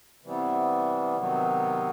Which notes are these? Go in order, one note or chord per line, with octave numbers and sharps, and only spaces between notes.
C3 E3 G3 B3
C3 D#3 F#3 B3